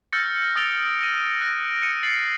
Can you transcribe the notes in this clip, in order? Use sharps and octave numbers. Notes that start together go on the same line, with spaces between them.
E6 F6 G6 A6 A#6 C#7
D#6 E6 A6 D7 F7 G7
A#6 D#7
F#6 A#6 D7
C#7 D#7
A6 C7 F#7